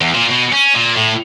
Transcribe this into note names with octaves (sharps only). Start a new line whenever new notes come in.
E2
A#2
B2
C#4
A#2
A2